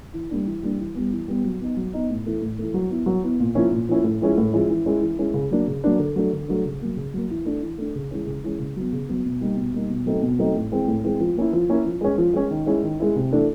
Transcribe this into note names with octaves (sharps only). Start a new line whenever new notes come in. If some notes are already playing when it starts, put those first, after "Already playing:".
E3
G3 A#3 D4
E3
G3 A#3 D4
E3
G3 B3
E3
G3 B3
F#3
B3 D#4
F#3
B3 D#4
A2
E3 A3
A2
E3 A3
F#3
B3 E4
F#3
B3 E4
A#2
F3 A#3 C#4 E4
A#2
F3 A#3 C#4 E4
A2
F3 G#3 C#4 E4
A2
F3 G#3 C#4 E4
E3
G#3 C#4 E4
E3
G#3 C#4 E4
C#3
F#3 A#3 D4
C#3
F#3 A#3 D4
D3
F#3 A3 D4
D3
F#3 A3 D4
C#3
F#3 A#3
C#3
F#3 A#3
E3
A3 D4
E3
A3 D4
C#3
E3 G#3 C#4
C#3
E3 G#3 C#4
C#3
F#3 B3
C#3
F#3 B3
B2
G3 A#3 D#4
B2
G3 A#3 D#4
B2
F#3 A3 C4 D#4
B2
F#3 A3 C4 D#4
A2
E3 G#3 C4
A2
E3 G#3 C4
F3
A#3 C#4 E4
F3
A#3 C#4 E4
F3
G#3 C#4
F3
G#3 C#4
D#3
G#3 C#4 E4
D#3
G#3 C#4 E4
C3
E3 A3 D4